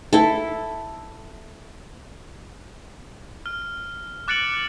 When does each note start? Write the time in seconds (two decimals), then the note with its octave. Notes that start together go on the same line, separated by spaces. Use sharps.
0.13 E4 A4
3.46 F6
4.28 D6 F#6 A6 C#7 D7 F#7